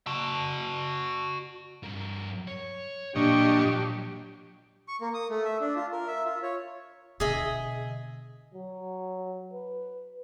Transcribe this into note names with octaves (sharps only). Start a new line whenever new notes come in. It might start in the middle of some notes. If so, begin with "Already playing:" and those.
F#4 A5
G2 A#4
C#5
A#2 F3 F#3 D4 G4 D#5 C#6
C#6
A#3
D#6
A3
E5
D4
F4
A#4
E5
F4
C#5
B2 D3 G#4 D#5 E5
F#3
B4